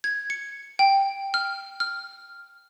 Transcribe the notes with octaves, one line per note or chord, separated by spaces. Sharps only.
G#6
C#7
G5
F6
F6